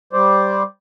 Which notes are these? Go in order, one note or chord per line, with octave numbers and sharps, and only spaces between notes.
G3 C5 D5